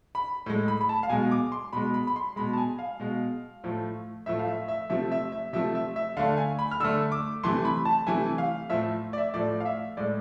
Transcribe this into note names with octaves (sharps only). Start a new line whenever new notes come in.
B5
A2 G#3
B5
B5
A5
F5
B2 G#3 G#5
D6
C6
B2 G#3 B5
B5
B5
C6
B2 G#3 B5
A5
G#5
F5
B2 G#3
A2 F3 A3
A2 F3 A3 E5
F5
E5
E5
C3 F3 A3 E5
E5
E5
C3 F3 A3 E5
E5
E5
D3 A3 F5
G#5
B5
F6
D3 A3 E6
D6
C3 E3 A3 C6
B5
A5
C3 E3 A3 G#5
F5
A2 F3 A3 E5
D5
E5
A2 F3 A3 D5
F5
E5
A2 G#3 D5